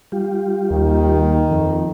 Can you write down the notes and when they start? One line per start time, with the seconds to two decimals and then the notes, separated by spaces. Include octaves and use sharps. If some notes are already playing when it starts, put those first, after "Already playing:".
0.12 G3 F4 G4
0.71 D#2 D#3
1.51 F2